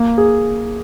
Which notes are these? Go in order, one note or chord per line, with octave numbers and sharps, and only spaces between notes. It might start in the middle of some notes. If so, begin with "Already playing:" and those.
Already playing: A#3
G#4